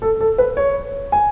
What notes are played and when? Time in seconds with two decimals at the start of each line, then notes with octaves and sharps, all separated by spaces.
0.02 A4
0.21 A4
0.38 B4
0.57 C#5
1.12 G#5